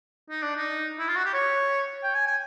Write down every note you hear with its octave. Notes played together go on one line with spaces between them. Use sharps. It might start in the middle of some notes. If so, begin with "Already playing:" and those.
D#4
D4
D#4
E4
F4
F#4
G4
C#5
G5
G#5
G#5